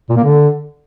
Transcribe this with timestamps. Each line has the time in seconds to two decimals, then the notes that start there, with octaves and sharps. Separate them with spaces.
0.10 A#2
0.17 A#3
0.24 D3